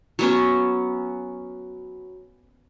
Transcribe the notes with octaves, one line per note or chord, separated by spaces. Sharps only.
F#3 B3 C#4